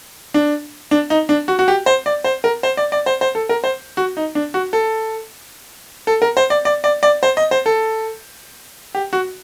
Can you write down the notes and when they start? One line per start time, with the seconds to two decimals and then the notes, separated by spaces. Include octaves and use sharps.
0.34 D4
0.91 D4
1.10 D#4
1.29 D4
1.48 F#4
1.59 F#4
1.68 G4
1.86 C5
2.06 D5
2.24 C5
2.44 A#4
2.63 C5
2.77 D5
2.92 D5
3.06 C5
3.21 C5
3.35 A4
3.49 A#4
3.64 C5
3.97 F#4
4.17 D#4
4.35 D4
4.54 F#4
4.73 A4
6.07 A4
6.22 A#4
6.37 C5
6.50 D5
6.65 D5
6.84 D5
7.03 D5
7.23 C5
7.37 D#5
7.51 C5
7.66 A4
8.95 G4
9.13 F#4